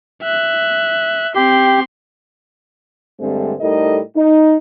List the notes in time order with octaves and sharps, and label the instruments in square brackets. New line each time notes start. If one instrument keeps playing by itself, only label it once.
[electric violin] E5 F#6
[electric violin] C4 C6 [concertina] G4
[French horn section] G2 D3 G#3 A3 C4
A2 G3 D#4 A4 A#4 D#5
D#4